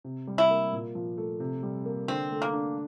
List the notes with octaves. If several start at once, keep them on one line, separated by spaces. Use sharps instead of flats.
C3
G3
E4
A#3
A#2
F3
A3
C3
G3
A#3
D3 C4
A3
A#3
D4